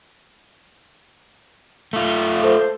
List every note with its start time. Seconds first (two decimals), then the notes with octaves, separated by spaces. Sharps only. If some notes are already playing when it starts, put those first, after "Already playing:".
1.93 A3 F4
2.43 A4 C5